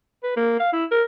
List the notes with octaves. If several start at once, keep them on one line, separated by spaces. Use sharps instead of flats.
B4
A#3
F5
E4
A#4